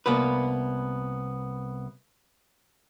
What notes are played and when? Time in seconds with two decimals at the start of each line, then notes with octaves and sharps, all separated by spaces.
0.06 C2 A#3 B3 B4